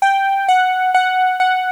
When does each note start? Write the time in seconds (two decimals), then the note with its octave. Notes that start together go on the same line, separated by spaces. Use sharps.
0.02 G5
0.48 F#5
0.94 F#5
1.40 F#5